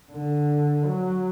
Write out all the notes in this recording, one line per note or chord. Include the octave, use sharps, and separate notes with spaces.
D3
F#3